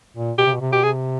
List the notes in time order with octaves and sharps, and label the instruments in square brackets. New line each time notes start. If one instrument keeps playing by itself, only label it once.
[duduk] A#2
[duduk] B2 [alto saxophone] G4
[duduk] C3
B2
C3
[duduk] B2 [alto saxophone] G4
[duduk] C3 [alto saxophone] G#4